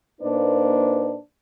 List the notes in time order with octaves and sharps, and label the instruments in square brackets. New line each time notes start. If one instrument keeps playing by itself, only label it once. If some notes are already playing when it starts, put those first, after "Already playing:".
[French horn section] A#2 A#3 D4 D#4 B4 C5